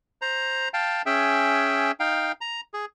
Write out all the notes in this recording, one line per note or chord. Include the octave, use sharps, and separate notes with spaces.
C5 A#5
F5 G5 A5
C#4 G#4 E5 G5
D#4 F5 G5
A#5
G#4